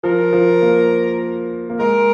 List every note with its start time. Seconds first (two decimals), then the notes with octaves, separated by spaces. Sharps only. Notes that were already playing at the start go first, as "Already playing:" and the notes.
0.04 F3 A#4
0.33 F3
0.62 A#3
1.70 A#3
1.79 G#3 A#4